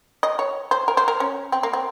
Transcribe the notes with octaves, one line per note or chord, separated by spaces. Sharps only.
D#5
C#5
C5
A#4
C5
A#4
C#4
C4
A#3
C4